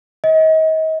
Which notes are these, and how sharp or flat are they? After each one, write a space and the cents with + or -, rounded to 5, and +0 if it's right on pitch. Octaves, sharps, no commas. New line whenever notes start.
D#5 +35